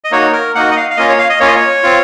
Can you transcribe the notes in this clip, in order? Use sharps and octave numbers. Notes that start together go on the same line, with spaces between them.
D#5
A#3 D#4 F#4 C#5
A#4
A#3 D#4 F#4 F#5
D#5
F5
F5
A#3 C#4 F4 D#5
C#5
F5
D#5
A#3 C#4 F4 C#5
D#5
C#5
C4 F4